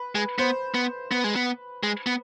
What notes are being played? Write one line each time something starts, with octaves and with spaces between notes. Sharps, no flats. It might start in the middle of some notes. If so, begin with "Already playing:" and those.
Already playing: B4
G#3
B3 C5
B3
B3 B4
G#3
B3
G#3
B3